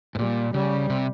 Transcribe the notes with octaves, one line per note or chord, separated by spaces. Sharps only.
G#2
A#2 G3
C#3 G3
C3